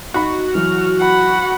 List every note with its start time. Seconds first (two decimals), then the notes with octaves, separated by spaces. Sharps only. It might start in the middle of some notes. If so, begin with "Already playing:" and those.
0.14 D#4 F#4 B5
0.55 E3 F#3 F6
0.98 F#5 B5